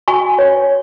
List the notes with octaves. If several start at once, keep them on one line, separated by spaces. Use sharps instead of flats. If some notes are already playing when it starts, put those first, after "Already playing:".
F#4 G#5 C#6
C#5